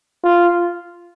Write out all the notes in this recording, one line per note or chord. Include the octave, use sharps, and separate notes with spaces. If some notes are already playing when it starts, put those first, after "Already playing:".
F4